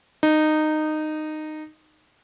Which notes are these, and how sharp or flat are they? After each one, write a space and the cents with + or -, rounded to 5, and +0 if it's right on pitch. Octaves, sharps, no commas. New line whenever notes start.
D#4 -15